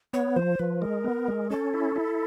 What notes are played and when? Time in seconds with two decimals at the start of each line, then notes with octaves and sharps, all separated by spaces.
0.13 B3 C#5
0.36 F3 C5
0.59 F3 B4
0.81 G#3 A#4
1.04 B3
1.28 G#3
1.50 C#4 A4
1.74 E4
1.96 E4